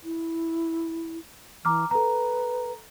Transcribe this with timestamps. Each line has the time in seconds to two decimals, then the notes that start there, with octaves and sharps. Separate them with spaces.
0.04 E4
1.65 E3 A#5 D6 F6
1.91 A4 B4 A#5